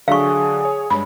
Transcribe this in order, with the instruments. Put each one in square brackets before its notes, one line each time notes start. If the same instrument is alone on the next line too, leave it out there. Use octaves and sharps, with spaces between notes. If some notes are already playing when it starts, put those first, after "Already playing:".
[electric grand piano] D3 F#3 D4 [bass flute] G#4 [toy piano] F5 C#6
[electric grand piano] C#5
[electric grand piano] G2 G#3 C#5 [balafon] B5